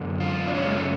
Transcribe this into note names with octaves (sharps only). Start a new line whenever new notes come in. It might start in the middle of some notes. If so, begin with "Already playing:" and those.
Already playing: F#2 D3
F4
D4
F#2 C#3 C#4
G#3
A3